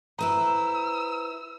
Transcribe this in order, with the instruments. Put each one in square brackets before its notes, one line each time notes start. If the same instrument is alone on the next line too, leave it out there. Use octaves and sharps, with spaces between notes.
[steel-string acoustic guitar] E4 B4 C5 [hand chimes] A#5 [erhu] E6